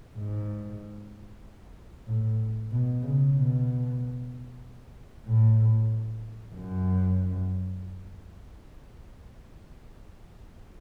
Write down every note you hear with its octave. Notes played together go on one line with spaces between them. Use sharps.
G#2
A2
B2
C#3
B2
A2
F#2